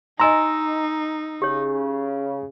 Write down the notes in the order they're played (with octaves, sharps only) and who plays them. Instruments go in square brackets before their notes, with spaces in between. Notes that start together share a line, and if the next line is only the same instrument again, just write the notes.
[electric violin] D#4 [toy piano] D#5 G#5 C6 [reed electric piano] A#5 E6
[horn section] C#3 [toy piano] G4 C#5